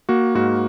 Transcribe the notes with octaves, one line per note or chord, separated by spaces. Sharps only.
A#3 F#4
G#2 F#4